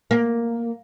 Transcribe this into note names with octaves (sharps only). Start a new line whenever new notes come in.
A#3